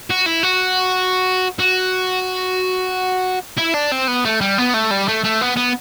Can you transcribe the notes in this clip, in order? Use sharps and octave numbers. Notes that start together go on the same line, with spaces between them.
F#4
E4
F#4
F#4
E4
D4
C4
B3
A3
G3
B3
A3
G3
A3
A3
B3
B3